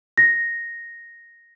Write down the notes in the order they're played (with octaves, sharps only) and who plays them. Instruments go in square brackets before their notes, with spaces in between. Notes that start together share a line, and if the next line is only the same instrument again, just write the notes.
[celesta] A#6